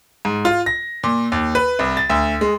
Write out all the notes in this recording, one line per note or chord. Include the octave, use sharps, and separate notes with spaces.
G#2
F4
A#6
A#2
D#2
B4
C2
A6
D2
G#3